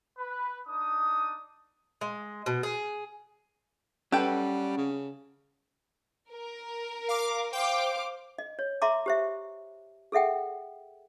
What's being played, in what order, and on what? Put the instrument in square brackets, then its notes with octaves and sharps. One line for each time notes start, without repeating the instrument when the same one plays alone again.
[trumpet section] B4
D4 D#4 D#6
[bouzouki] G#3
B2
G#4
[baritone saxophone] G3 [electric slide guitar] C#4 F#5 [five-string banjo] A4 B4 G5
[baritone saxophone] C#3
[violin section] A#4
[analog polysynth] F5 D6
[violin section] C5 F5 D6 [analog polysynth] G5
[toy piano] D#5
C#5
E5 A#5 C6 D6
G4 C5 E5
G#4 A4 E5 F#5 G5